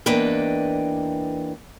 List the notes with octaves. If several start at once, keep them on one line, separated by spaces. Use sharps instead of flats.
E2 A#3 D4 D#4 B4 G5